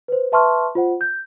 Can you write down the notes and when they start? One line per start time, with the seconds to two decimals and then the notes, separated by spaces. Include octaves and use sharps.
0.08 B4 C5
0.32 B4 E5 A5 C6 C#6 F6
0.75 F4 C5 F#5
1.01 G6